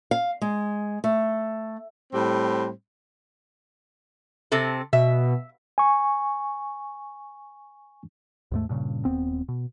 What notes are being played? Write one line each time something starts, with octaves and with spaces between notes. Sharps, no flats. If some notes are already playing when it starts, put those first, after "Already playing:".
F5
G#3
A3
A2 G3 C4
C3 C4 A4
B2 E5
G#5 C#6
D#2 G#2 A3
G2 A#2 C#3
D#1 D#2 B3 C4
B2